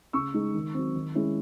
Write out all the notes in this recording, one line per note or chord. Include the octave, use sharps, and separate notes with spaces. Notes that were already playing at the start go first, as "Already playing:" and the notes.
C#3 C#6 E6
G#3 D#4
D#3
F#3 C4
D#3
G#3 C#4 E4